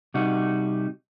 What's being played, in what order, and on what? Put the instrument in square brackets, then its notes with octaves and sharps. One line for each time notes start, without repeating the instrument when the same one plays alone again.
[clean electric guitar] C3 G3 D#4 F#4